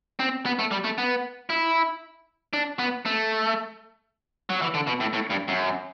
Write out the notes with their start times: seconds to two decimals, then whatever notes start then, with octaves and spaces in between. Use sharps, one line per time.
0.19 C4
0.46 B3
0.59 A3
0.71 G3
0.84 A3
0.98 B3
1.50 E4
2.53 D4
2.79 B3
3.05 A3
4.50 F#3
4.62 E3
4.74 D3
4.87 B2
5.00 A2
5.13 A2
5.30 G2
5.48 F#2